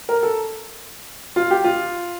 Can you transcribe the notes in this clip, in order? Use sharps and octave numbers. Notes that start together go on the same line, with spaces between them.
A#4
A4
F4
G4
F4